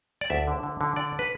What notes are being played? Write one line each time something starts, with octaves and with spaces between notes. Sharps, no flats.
D5
D2 E5
D3
D3
D3
D3 D5
B4